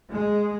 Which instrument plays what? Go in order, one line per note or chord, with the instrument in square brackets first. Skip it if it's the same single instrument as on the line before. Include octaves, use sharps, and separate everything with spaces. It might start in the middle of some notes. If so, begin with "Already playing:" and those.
[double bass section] G#3